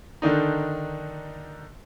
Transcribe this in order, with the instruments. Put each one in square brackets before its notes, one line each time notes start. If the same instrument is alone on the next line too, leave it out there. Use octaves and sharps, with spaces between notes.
[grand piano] D3 D#3 D4 D#4